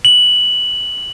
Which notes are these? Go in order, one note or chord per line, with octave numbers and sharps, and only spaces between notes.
F#7